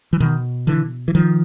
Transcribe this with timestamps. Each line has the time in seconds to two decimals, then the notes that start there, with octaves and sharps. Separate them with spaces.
0.13 E3
0.20 B2 D#3
0.67 D3 E3
1.08 E3
1.15 D#3 F3